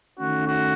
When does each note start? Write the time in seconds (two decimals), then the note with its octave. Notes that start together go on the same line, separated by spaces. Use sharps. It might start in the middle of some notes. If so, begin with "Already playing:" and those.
0.18 D#3 A3 C#4 F#4
0.45 F#4